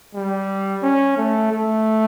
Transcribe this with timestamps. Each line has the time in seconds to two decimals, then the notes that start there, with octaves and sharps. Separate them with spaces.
0.15 G3
0.83 C#4
1.18 A3
1.52 A3